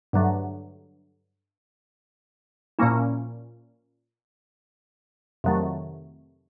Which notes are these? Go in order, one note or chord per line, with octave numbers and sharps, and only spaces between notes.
G2 D3 F#3 A3
A#2 F3 A#3 C#4 E4
F2 C3 D#3 F#3 A3